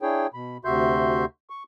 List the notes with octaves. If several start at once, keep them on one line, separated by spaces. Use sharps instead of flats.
D4 E4 G#4 C#5 G5
B2 B5
D2 C3 F#4 E5 C6 G6
C#6